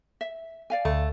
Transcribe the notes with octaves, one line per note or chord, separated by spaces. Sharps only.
E5
D5 F5 G#5
D2 A3